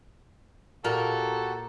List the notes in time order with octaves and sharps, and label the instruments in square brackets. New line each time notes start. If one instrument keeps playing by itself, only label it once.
[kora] A#2 [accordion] F#4 G4 F#5 [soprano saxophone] A4 [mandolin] A#4